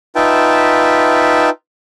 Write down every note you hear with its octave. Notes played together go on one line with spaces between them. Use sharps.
D#4 F4 B4 E5 G5 A5